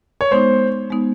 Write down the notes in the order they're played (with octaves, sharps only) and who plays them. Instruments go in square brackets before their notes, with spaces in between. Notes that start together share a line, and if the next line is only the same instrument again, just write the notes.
[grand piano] C#5
[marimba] G#3 B3 D#4 [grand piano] C5
[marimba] G#3 B3 D#4